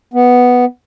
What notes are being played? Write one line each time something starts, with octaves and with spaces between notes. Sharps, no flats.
B3